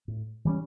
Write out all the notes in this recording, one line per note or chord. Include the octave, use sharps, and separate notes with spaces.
A2
E3 G3 C#4